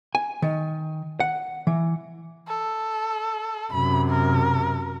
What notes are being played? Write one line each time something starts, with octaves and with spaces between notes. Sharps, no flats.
G#5
D#3
F#5
E3
A4
F#2 C3 B5
A#4